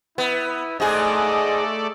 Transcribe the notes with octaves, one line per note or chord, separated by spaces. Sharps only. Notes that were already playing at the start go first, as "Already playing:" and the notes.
B3 E4
G#2 A3 G#4 A4 D5 D#5